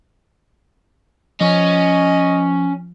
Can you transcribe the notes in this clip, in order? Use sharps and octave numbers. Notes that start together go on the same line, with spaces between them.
F3 C#4 D#5